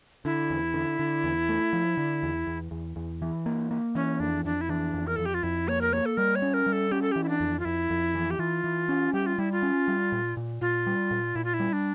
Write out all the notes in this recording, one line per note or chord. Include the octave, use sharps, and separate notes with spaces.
D3 E4
E2
D3
D3
E2
A3
F3
D3
E2
E2
E2
E2
E3
A#3
A#3
E3 C#4
F2 D4
F2 D4
E4
E3 D4
F2
A#4
F2 A4
G4
F4
F2 E4
A#3 C#5
A#4
A#3 C#5
A4
G3 A#4
C#5
C#4
A#4
G3
A4
C#4 G4
A4
E3 G4
E4
D4
F2
F4
F2 E4
F2
E3
G4
E3 F4
E3
C#4
G3 G4
F4
G3 E4
F4
C#4
G3
A#2
A#2
A#2 F4
G3
A#2
A#2 E4
F4
E4
G3
D4